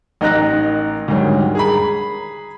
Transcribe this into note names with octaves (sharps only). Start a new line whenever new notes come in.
A1 D#4 A#4 F#6 A#6
D2 G#2 D#3 G3 C#4
G#4 A#5 B5